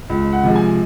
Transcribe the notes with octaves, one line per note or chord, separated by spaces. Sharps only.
C#2
F#5
C3 F3 G#3
G#5